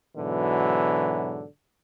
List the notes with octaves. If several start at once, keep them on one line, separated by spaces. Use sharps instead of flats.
G#2 B2 D3 E3 F#3